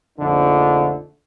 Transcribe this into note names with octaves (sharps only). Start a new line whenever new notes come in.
A#1 F2 D3 A3 D4 D#4